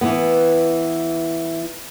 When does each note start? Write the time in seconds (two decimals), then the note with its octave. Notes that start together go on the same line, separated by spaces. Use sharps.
0.01 E3 B3